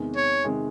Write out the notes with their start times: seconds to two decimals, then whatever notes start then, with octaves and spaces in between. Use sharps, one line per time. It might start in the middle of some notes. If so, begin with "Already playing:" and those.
Already playing: E2 C3 D#3 G#3
0.16 C#5
0.44 C3 D#3 G#3